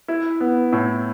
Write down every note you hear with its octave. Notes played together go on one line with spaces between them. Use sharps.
E4
B3
A2